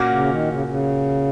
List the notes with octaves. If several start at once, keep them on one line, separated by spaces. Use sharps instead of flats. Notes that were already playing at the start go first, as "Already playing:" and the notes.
Already playing: A#2 A#3 C#4 F#4
C#3
D#3
C#3
C#3